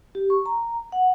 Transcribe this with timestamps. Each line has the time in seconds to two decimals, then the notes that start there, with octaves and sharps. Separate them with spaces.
0.15 G4
0.30 C#6
0.46 A#5
0.92 F#5